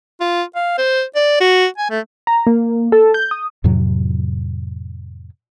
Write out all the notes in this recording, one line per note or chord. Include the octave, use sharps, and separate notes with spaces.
F4
F5
C5
D5
F#4
G#5
A3
A#5
A#3
A4
G6
D#6
F2 A2 C3 F#3